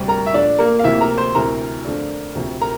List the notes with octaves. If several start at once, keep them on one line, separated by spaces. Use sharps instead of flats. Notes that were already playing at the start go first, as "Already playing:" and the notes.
Already playing: D2 C3 G3
A#4 A#5
E5
A#2 F3 A3 D4 D5
A#3 A#4
F5
D2 C3 F3 A#3 E4 E5
A#4 A#5
C5 C6
D2 C3 E3 A#4 A#5
F2 D3 A3 D4
D2 C3 F3
A#4 A#5